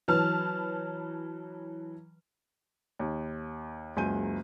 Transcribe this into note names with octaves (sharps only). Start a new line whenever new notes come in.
E3 F#3 B4 A5 F6
D#2
F#1 C#2 F#3 G#5 G6 D#7